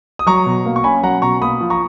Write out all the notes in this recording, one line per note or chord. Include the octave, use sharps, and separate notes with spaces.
D#6
F#3 A#5 C#6
B2
A#3
C#6
C#4 G#5 B5
F#3 F#5 A#5
B2 A#5 C#6
A#3 B5 D#6
F3
A#5 C#6